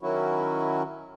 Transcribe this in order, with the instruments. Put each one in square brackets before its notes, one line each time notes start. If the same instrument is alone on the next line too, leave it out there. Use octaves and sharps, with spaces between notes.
[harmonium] D#3 F#3 C#4 E4 F#4